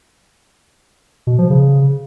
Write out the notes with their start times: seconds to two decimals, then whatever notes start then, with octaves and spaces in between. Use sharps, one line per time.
1.27 B2
1.38 F3
1.50 C#3